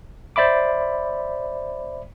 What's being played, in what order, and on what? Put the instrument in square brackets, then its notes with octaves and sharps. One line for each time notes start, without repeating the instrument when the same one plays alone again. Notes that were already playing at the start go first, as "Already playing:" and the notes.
[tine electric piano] C5 D5 E5 B5 D6